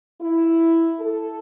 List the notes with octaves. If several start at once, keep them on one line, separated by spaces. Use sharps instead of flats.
E4
A4